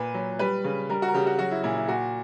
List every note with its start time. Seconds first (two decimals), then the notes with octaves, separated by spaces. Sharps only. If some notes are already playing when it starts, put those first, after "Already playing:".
Already playing: A#2 B4
0.14 F#3
0.39 G3 B4
0.64 C#3
0.90 G3 A#4
1.02 F#4
1.08 A#4
1.14 C#3 G4
1.26 F#4
1.38 F#3 F#4
1.51 E4
1.64 A#2 E4
1.76 E4
1.88 A#2 F#4